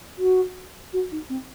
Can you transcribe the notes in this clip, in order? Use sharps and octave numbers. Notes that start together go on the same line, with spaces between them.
F#4
F#4
D#4
C4